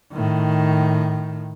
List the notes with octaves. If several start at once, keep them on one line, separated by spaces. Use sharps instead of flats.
A2 D#3